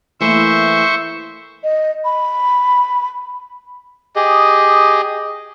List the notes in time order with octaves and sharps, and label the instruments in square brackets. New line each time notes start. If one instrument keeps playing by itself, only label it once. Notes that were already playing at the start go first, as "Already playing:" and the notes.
[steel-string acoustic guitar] E3 A3 A#3 [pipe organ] C5 E5 C#6
[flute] D#5
B5
[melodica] G4 G#4 D#5